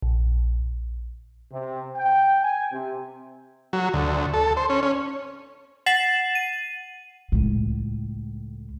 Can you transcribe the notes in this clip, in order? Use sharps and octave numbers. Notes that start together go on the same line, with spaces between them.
A#1
C3
G5
G#5
C3
F#3
D2
A4
C5
C#4
C#4
F#5 A6 C7 E7 F#7
D#7
C#2 A2